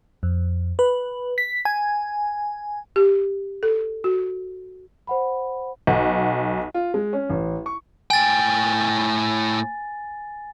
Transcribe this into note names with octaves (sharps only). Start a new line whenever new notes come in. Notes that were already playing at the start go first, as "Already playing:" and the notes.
F2
B4
B6
G#5
G4
A4
F#4
C5 F#5 B5
B1 F#5
F4
G#3
C#4
A1
C#6
A2 G5 G#5 A6